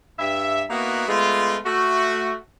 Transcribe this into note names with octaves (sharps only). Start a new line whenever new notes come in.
G2 E5
A#3 B3 D#4 E4 F#4
G#3 A3 B3 F4
A3 F#4